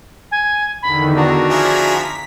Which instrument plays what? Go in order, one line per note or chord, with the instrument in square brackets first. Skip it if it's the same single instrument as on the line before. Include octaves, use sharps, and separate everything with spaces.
[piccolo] G#5
[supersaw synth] E2 D3 D#3 [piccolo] B5
[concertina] D4 F#4 [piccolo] A#5
[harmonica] F3 E4 G#4 [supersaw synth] B6